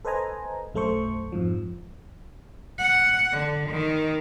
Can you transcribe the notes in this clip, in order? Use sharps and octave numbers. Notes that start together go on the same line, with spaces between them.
A4 B4 C5 D#5 G#5 A#5
B1 F#2 A3 A4 C5 C#6
F2 G#2 F3
F#5
D3
D#3